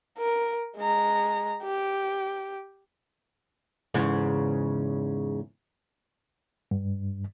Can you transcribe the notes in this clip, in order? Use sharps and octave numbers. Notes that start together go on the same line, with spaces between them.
A#4
G#3 A#5
G4
E2 G#2 C#3
G2